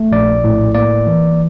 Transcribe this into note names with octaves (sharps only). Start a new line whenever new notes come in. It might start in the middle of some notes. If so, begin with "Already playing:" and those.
Already playing: A3
A#1 D5
A2
A#3 D5
E3